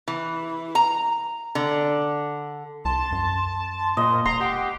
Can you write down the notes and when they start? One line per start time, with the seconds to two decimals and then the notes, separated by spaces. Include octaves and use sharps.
0.08 E3
0.75 A#5
1.55 D3
2.85 C2 A5 C6
3.12 F#2
3.78 C6
3.97 A#2 D#5 C6
4.26 E1 A#5 C6 D#6
4.40 G4 F#5